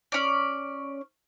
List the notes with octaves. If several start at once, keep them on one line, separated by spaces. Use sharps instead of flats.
C#4 D5